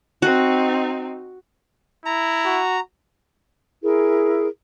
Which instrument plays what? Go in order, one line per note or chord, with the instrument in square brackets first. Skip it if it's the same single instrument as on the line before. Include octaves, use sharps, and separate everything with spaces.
[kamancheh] C4 D#4 [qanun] F#4
[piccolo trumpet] E4 [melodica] A#5
[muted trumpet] F#4
[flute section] E4 G#4 A#4